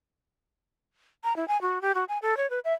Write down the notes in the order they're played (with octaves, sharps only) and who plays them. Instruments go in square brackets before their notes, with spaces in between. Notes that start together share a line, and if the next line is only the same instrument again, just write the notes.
[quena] A#5
E4
G#5
F#4
G4
F#4
G#5
A4
C#5
B4
E5